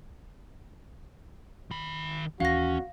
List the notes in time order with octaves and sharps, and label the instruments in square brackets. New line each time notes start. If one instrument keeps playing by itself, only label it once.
[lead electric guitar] D#3 B5
[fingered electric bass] D#2 E3 [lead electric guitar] C#4 [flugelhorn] F#4 [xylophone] F5 A#6